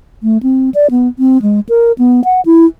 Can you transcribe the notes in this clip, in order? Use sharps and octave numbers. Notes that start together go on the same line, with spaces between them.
A3
C4
D5
B3
C4
G#3
A#4
B3
F#5
E4